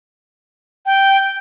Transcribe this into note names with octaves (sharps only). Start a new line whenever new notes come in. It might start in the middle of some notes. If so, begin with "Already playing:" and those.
G5